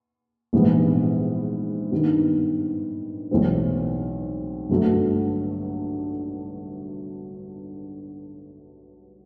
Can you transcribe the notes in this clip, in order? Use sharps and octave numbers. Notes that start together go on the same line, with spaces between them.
A#1 G#2 E3 G3 B3
G2 D#3 G3 B3
B1 A2 E3 G#3 C4
G1 G2 D3 F#3 A3